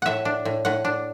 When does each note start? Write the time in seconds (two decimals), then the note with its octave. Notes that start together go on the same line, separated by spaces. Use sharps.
0.02 A2 E5 F#5
0.25 D4
0.45 A2
0.65 A2 F#5
0.85 D4